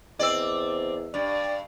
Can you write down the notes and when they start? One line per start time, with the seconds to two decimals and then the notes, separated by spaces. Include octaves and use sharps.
0.19 E2 C4 D5 D#5 E6
1.14 G2 D5